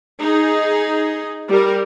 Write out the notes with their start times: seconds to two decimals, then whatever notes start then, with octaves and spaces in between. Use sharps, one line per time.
0.19 D#4 G#4
1.48 G3 A#4